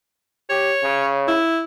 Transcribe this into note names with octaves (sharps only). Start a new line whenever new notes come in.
G4 C#5
C#3
E4